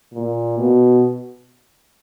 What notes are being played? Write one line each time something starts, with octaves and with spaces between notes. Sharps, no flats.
A#2
B2